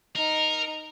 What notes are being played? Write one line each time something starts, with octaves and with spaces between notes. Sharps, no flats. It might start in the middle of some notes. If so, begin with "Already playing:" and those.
D#4 A#4